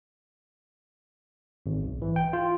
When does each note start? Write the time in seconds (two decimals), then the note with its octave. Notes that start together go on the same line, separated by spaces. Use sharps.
1.66 G#1
1.85 B1
2.02 E3
2.16 G5
2.33 F4